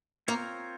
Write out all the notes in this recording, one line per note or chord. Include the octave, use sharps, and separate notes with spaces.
A#3 C4 F4 A#4 C#5